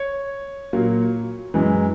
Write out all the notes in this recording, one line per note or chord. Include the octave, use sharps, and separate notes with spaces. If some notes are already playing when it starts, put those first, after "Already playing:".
Already playing: C#5
A#2 F#3 A#3
F#2 E3 G#3